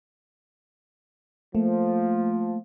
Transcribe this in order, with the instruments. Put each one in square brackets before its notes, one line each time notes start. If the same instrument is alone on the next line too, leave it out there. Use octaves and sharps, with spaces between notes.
[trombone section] F3 [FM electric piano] A3 A#3